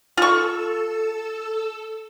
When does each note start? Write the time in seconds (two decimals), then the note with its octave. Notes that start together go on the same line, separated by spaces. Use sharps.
0.17 F4 A4 C#6 E6